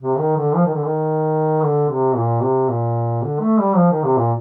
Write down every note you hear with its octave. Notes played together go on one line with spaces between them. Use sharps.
C3
D#3
D3
F3
D#3
D3
D#3
D3
C3
A#2
C3
A#2
D3
A3
G3
F3
D#3
C3
A#2